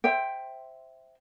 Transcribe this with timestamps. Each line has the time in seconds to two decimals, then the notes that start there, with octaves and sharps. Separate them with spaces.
0.04 C5 E5 G5